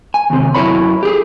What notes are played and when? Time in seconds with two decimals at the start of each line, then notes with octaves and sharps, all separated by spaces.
0.14 G#5
0.30 D#2 C3
0.54 F#2 E4 C#5 B5
1.03 G4 G#4